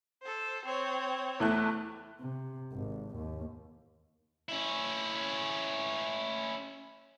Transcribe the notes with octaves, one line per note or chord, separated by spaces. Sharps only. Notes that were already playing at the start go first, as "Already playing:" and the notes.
A4 C5
C4 C#5
E2 A3 F#6
C3
G#1
D#2
C#4 E4